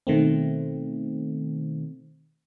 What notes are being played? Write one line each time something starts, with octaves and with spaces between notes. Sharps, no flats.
B2 D#3 A3 C4